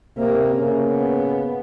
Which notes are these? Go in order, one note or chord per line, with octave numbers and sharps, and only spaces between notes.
C3 A#3
C#3
B3